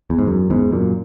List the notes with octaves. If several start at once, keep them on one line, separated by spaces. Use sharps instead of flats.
E2
G#2
F#2
E2 G#2
F#2 A#2